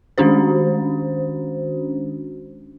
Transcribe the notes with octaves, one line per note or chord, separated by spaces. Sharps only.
D#3 G#3 C#4 D4 F#4 C5